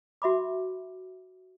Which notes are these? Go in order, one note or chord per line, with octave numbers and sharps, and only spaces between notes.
F#4 E5 B5 D6